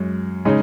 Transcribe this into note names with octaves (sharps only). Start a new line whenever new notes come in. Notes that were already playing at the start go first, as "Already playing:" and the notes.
Already playing: F#2 G#3
C#3 G#3 D#4